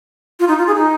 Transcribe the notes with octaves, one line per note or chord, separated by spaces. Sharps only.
F4
D#4
F4
G#4
D#4